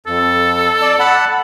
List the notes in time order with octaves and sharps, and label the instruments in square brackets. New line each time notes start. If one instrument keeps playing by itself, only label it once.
[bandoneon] F2 [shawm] A4
[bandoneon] D5 A5
F#5 A5 B5